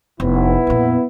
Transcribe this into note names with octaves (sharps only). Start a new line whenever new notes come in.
F1 B3 E4
F2 A#2